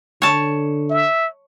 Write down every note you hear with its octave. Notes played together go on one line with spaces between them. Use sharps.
D3 C#5 A5
E5